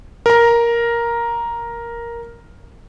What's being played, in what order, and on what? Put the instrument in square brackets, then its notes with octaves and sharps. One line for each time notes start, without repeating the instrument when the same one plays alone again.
[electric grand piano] A#4 A#5